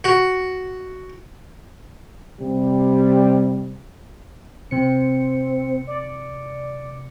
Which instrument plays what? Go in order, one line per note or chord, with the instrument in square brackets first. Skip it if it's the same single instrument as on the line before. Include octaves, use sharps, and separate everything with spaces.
[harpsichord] F#4
[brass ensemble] C3 G3
[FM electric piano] C3 C#7 [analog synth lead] C4
[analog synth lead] D5